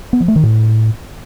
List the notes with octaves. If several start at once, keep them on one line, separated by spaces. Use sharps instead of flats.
B3
F3
A3
D#3
A2